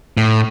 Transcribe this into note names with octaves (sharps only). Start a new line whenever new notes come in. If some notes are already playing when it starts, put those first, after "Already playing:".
A2